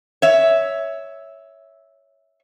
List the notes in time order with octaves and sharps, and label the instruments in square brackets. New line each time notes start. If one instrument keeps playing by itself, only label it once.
[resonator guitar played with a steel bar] C#5 E5